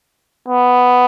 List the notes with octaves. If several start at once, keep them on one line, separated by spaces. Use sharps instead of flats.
B3